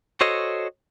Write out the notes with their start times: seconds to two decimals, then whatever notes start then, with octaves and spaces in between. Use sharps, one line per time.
0.21 F#4 A4 C5 C#5 D#5